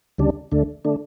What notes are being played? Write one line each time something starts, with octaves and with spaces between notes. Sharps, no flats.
D2 C#3 G3 D4
D2 D3 A3 D4
D3 A3 D4